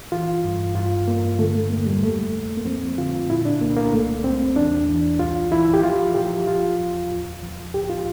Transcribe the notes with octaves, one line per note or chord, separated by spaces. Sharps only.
E3 F4
G2
G2 F4
G2 A#3
D3 A3
A3
E2 A#3
G3
F2 A3
F2
A#3
F3 C4
D3 F4
A#2 E4
D4
C2 A#3
A#3
C2 A3
C2 C4
E2 D4
E3
C2 F4
E3 E4
G4
F3 F4
F3 G4
F3 F4
E2
D2
F3
C2 G4
F4